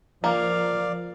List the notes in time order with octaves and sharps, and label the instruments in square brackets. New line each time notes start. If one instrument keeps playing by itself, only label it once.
[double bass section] F3 [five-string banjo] A#3 [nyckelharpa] A#4 F5 [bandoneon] D5